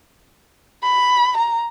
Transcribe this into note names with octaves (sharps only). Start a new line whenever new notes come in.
B5
A#5